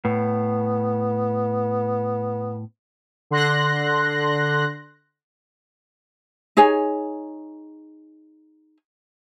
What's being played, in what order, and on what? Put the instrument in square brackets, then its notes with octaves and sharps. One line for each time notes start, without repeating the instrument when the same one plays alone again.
[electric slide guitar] A2 [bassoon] B3
[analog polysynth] D3 C6 F#6 A#6
[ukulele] D#4 G#4 C#5 G#5